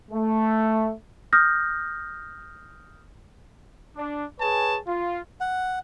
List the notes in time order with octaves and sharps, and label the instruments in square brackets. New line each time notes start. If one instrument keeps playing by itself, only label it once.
[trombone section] A3
[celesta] D#6 F6 G6 A#6
[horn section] D4
G#4 B4 C#5 G#5 A5
F4
[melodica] F#5